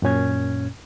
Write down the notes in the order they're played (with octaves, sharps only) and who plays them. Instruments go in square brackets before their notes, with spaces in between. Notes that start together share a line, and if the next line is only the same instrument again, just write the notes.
[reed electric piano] F#2 A#2 C#4 G#6